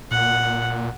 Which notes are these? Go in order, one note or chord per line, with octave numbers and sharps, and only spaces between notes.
A#2 F#5